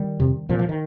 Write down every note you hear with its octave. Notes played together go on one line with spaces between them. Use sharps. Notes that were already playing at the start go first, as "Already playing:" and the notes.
Already playing: D#3 G3
F2 C3
C2 A#2 F3
F3
D#3